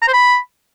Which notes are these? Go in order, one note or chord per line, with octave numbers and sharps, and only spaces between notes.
A#5
C5
B5